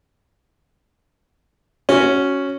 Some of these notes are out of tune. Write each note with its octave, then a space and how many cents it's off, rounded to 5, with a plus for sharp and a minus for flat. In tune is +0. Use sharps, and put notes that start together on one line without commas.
C#4 +0 F#4 +0